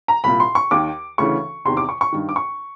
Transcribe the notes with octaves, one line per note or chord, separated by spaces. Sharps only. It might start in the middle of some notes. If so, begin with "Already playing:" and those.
A#5
C2 A#2 B5
C6
C#6
D#2 D#3 D6
D2 C#3 E3 C#6
E2 C3 D#3 C6
D6
C#6
C#6
G2 D#3
D6
C#6